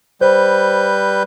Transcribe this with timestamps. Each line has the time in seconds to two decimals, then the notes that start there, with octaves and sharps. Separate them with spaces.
0.21 G3 B4 C5 G6